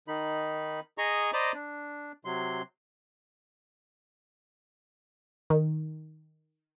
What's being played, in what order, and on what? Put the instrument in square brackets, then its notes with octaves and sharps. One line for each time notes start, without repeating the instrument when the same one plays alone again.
[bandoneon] D#3 D#4 B5
G#4 D#5 A#5 C#6
C5 D5 D#5 A#5 B5 D6
D4
C3 F#3 C6
[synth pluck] D#3